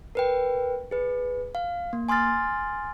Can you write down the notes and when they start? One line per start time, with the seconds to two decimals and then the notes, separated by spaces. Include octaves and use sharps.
0.15 A#4 B4 G5
0.91 G#4 B4
1.55 F5
1.93 A#3
2.09 G#5 C6 D#6 F6 A6